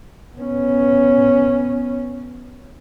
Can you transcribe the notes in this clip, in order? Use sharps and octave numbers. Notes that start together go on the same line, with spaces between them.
B3 C#4